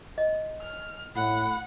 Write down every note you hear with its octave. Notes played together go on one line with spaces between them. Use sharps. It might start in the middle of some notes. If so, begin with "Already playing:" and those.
D#5
F6
A2 F#5 B5